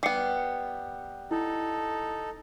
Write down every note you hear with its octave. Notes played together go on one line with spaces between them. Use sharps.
G3 B3 D6 C7 C#7
D#4 E4 A4